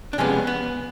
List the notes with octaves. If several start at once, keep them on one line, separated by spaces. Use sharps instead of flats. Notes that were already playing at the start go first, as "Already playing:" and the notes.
D4
C3 F3 G#3 B3 C#4
B3